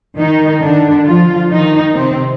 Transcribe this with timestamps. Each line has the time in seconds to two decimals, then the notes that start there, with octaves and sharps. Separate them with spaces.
0.19 D#3 D#4
0.63 D3 D4
1.07 F3 F4
1.51 D#3 D#4
1.95 C3 C4